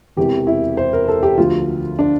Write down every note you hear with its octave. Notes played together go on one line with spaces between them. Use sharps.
E1 E2 C3 E3 G4
E4
C5
A#4
A4
G4
D2 D3 F3 F4
D4